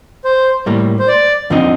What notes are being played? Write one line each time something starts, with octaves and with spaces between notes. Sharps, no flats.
C5
A2 G3 A#3
C5
D5
F2 D3 F3 C4 D#4